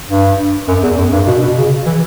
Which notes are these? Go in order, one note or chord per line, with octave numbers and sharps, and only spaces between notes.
G2
F#2
E2
F#2
G2
B2
B2
C#3
E3